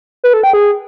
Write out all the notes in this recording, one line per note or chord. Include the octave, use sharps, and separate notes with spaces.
B4
A4
G5
G#4